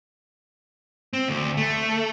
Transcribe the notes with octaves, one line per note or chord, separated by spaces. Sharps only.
C4
D2
A3